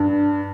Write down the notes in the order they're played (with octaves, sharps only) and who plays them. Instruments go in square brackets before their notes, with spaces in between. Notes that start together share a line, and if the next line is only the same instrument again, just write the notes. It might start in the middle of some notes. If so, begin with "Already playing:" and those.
Already playing: [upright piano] G2